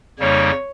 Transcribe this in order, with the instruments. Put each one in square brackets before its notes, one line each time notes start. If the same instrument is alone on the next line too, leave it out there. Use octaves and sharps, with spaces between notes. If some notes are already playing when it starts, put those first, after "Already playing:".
[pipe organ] F2 C#3 G3 A#3 D#4 [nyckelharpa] C#5